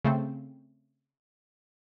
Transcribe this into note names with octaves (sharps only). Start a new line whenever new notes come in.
C#3 A3 C4